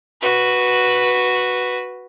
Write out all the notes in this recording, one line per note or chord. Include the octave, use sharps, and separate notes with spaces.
F#4 B4